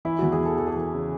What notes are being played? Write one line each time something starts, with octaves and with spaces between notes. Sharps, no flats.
E3 E4
E2 F#4
G#4
E3 A4
E3 A4
G#4
E3 A4
C#3